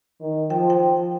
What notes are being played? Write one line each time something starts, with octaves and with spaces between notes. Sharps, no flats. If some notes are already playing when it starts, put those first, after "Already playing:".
D#3
F3 G5
G5